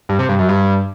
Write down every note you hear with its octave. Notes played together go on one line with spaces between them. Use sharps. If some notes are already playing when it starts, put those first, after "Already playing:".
G2
C3
G2
F#2
G2